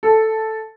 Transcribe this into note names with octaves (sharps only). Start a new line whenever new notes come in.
A4